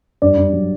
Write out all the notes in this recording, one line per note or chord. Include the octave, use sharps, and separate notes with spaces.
G2 D5
G2
F#3